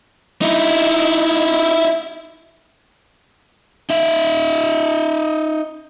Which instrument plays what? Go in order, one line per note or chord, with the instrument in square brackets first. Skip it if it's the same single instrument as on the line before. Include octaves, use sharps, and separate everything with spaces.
[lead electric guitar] D#4 E4
[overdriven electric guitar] D#4 E5